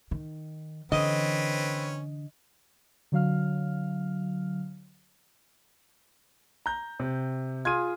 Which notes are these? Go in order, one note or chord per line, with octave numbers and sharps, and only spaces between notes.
D#3
D3 E3 C4 C#4 B4 D#5
D3 F#3 F5 F6
A#5 G6
C3
F4 G#4 G#6 D#7